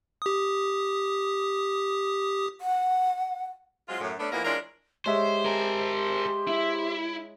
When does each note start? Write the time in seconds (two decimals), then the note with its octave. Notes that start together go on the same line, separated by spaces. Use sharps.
0.22 G4 D#6
2.61 F#5
3.88 F#3 G#3 C4 F4
4.00 F#2 A2
4.19 A3 B3 C#4 D4
4.32 E2 E3 F3 A#3 D#4 A#4
4.45 E3 G#3 C#4 D4 F4 A#4
5.06 G#3 G4 C5 C#5 E5
5.45 G#4 A#4
6.48 E4